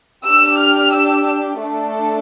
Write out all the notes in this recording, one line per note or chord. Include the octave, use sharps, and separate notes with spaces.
D4 G4 E6
F6
E6
A3 D4 A4